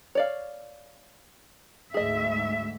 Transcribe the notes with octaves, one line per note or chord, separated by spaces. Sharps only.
C#5 D5 F5
D2 G#2 G#4 D#5 E5